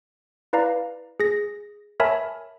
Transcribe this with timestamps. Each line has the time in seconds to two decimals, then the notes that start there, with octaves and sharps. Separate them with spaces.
0.53 E4 B4 D5 F5 A#5
1.20 G#4 A#6
2.00 A#4 C#5 E5 G#5 A5 B5